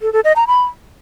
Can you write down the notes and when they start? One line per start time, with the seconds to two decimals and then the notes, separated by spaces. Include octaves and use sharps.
0.01 A4
0.13 A4
0.24 D#5
0.36 A#5
0.47 B5